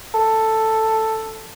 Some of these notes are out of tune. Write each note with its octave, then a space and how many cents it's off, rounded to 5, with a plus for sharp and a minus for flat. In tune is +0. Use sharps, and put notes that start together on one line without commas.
A4 +5